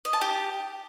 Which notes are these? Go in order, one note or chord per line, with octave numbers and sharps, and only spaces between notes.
D#5
A5
G4